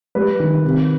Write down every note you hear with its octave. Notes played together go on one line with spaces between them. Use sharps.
G3 B4
D#3
C3